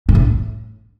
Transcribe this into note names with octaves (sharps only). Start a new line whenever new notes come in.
G#2
A2